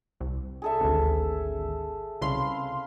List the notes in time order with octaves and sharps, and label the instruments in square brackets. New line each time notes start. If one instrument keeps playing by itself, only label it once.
[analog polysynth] C2
[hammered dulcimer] G#4 A4 E5
[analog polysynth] G#1 D2
[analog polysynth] C2 C#3 C6 [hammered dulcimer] B4 F5